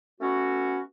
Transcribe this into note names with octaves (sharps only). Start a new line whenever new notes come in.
A3 B3 C#4 F#4